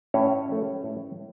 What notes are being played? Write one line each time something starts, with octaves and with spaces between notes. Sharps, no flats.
A2 C#4 C#5
F3 A3
A2